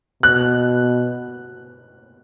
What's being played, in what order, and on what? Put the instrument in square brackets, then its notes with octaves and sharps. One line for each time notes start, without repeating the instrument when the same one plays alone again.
[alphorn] B2 [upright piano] F#6